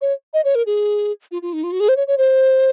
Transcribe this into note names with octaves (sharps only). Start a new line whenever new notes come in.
C#5
D#5
C#5
A#4
G#4
F4
F4
D#4
F4
F#4
G#4
C5
C#5
C#5
C5